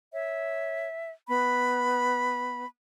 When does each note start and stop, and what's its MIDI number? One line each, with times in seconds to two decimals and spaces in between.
0.13 0.88 73
0.13 1.11 76
1.28 2.64 59
1.28 2.67 83